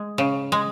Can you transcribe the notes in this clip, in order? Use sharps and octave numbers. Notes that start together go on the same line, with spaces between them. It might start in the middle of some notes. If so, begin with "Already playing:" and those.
Already playing: G#3
C#3
G#3